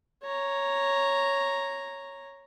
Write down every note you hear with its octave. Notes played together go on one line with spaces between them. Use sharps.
C#5 A#5